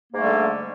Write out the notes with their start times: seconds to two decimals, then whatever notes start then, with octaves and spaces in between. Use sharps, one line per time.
0.11 A#3
0.14 G#2
0.17 A3
0.19 G3
0.22 D3